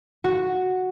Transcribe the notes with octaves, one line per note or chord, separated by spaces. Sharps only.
F#4